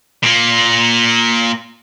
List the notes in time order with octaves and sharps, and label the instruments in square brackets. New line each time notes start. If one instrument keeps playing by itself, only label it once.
[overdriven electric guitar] A#2 A#3